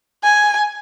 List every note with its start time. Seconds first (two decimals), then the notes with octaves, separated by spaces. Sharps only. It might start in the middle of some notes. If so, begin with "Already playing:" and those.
0.23 G#5